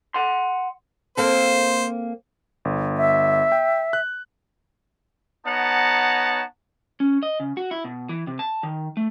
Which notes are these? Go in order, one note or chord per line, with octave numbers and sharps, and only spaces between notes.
F#5 C6
A#3 C4 A4 C5
G1
E5
G5
F#6
B3 D#4 C#5 F#5 A5 A#5
C#4
D#5
C#3
F#4
E4
B2
E3
C3
A5
D#3
A3